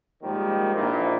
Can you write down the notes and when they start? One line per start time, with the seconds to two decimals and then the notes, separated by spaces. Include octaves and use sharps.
0.22 G#2 D#3 F3 G3 A#3
0.75 A#1 A#2 E3 F3 D#4